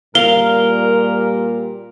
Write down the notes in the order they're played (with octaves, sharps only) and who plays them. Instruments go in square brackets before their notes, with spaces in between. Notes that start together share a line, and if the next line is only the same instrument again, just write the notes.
[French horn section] A#2 G3 [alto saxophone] A#4 [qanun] F5 [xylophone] G7